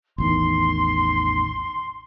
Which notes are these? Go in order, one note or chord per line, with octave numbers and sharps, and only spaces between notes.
A1 E2 D#3 C6